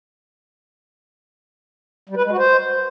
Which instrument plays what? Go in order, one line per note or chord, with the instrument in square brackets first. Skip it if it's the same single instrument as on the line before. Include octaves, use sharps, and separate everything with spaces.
[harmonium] G3
B4
G#3
F#4
C5